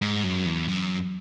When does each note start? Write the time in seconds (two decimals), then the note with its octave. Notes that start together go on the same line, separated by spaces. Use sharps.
0.02 G#2
0.24 F#2
0.46 E2
0.68 F#2